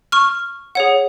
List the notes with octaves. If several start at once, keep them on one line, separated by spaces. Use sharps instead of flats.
C#6 F6
G#4 C#5 F#5